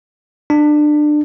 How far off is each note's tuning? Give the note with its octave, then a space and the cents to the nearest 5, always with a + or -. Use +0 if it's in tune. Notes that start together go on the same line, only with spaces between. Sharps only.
D4 +25